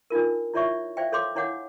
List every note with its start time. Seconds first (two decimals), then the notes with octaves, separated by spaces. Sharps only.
0.10 D4 D#4 F4 A#4
0.54 E4 F4 C#5 D5 E5 C#6
0.97 C5 D5 E5 F5 G5
1.12 A4 C#5 F5 C6 D6
1.35 D4 E4 C#5 F5 F#5 D6